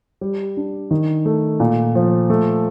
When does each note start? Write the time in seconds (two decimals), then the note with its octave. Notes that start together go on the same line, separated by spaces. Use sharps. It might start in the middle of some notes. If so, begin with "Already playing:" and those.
0.21 G3
0.57 D4
0.91 D#3
1.26 A3
1.60 A#2
1.95 F3
2.30 A3